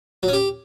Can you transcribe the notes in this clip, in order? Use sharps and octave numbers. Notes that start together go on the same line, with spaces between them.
F#3
C#4
G4